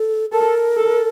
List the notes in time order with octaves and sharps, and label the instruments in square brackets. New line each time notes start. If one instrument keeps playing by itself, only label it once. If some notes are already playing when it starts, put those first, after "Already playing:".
Already playing: [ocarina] A4
[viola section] A4 [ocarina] A#4
[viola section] A4